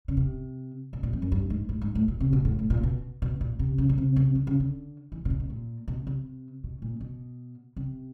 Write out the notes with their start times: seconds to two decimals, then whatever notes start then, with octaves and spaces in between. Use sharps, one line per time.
0.08 C#3
0.17 C3
0.93 B2
1.03 A#2
1.13 F2
1.22 F#2
1.32 G2
1.50 G#2
1.69 A2
1.82 G#2
1.95 A2
2.08 B2
2.20 C3
2.33 B2
2.45 A2
2.59 A2
2.70 A#2
2.83 B2
3.22 B2
3.41 A#2
3.59 C3
3.78 C#3
3.89 B2
3.98 C3
4.16 C3
4.35 D3
4.47 C#3
4.60 D3
5.12 E3
5.25 B2
5.30 A#2
5.40 B2
5.50 A#2
5.88 B2
6.07 C3
6.64 B2
6.82 A#2
7.01 B2
7.77 C3